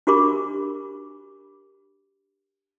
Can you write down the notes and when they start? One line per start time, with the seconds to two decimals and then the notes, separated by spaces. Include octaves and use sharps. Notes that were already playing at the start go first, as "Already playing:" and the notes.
0.07 D4 F#4 G4 A#4 B5 D6